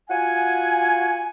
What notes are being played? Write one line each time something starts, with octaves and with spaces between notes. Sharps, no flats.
F4 F#4 F#5 G#5